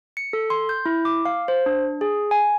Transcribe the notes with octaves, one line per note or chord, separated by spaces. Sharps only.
C#7
A4
C6
G6
E4
D6
F5
C5
D4
G#4
G#5